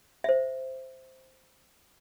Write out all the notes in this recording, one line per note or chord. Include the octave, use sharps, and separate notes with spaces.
C5 E5